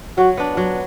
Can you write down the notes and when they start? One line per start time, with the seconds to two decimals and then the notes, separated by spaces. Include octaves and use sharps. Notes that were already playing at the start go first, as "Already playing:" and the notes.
0.18 F#3 F#4
0.37 B3 D4
0.57 F#3